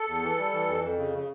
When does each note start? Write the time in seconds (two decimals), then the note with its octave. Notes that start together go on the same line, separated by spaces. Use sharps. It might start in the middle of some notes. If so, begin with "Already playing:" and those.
Already playing: A4
0.08 E2
0.23 E3
0.38 G3
0.52 E3
0.68 F2
0.83 F2
0.98 C#3
1.13 C#3